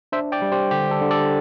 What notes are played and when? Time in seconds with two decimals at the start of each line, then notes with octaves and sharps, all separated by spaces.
0.12 D4 C5 E5
0.32 D5 G5
0.42 G3
0.52 G4 C5
0.71 D3 G4
0.91 A4
1.01 D3
1.11 A4 D5